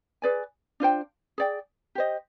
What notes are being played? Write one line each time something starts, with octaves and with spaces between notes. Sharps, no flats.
G#4 B4 D5 G#5
D4 F4 C5 G5
G#4 D5 G5
G4 C5 D#5